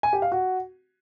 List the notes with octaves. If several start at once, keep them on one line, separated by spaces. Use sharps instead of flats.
G#5
G4
F5
F#4